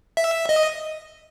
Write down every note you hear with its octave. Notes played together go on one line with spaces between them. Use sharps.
E5
D#5